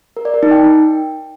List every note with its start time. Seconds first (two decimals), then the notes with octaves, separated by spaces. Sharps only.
0.17 A#4
0.25 D5
0.34 A#4
0.43 D#4
0.51 G5